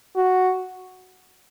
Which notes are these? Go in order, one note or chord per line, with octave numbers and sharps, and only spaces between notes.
F#4